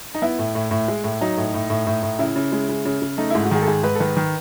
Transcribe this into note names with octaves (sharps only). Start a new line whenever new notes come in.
D#4
B3 E4
A2
A2
A2
G#3
A2
F#3 D#4
A2
A2
A2
A2
A2
C#3 E4
C#3
G#3
C#3
C#3
C#3
A3 D#4
G#2 E4
F#4
D#3 G#4
A4
G#2 G#4
G#2 B4
A4
D#3 B4
D#3